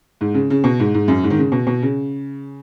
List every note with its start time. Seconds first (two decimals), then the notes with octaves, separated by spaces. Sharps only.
0.21 G#2
0.34 C#3
0.50 C#3
0.64 B2
0.80 G#2
0.94 G#2
1.08 F#2
1.24 G#2
1.30 D#3
1.38 C#3
1.52 B2
1.67 B2
1.82 C#3